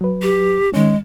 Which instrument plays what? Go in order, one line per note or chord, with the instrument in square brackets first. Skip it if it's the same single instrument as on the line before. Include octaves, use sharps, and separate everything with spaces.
[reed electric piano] F#3 B4
[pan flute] G4
[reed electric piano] D#3 C#4 [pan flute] G#3